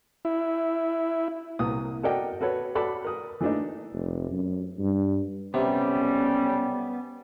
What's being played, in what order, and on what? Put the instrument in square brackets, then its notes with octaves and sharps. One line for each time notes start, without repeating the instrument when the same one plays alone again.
[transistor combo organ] E4
[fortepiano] C2 A#3 D#6
F#4 A4 A#4 D5 D#5 G5
F#4 A4 B4 C#5
F#4 A4 D5 B5 D6
A#4 D#6
E3 A3 A#3 D4 D#4
[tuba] F1
F#2
G2
[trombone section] B1 G3 [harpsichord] C3 [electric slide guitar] B3 [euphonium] C#4